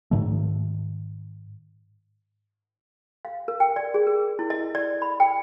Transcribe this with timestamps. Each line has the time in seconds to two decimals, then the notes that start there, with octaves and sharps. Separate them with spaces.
0.11 G#2 D#3 A3
3.25 F5
3.48 A#4
3.60 G5
3.76 D5
3.94 G#4
4.07 A#4
4.39 E4
4.50 D#5
4.75 D5
5.02 B5
5.20 G5